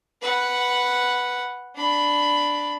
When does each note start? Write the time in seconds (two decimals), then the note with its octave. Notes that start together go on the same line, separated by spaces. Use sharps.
0.22 B4 F#5
1.76 D4 B5